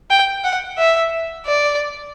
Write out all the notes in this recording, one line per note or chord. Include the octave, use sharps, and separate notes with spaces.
G5
F#5
E5
D5